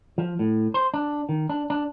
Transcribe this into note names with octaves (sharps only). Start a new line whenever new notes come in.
F3
A2
C5
D4
D#3
D4
D4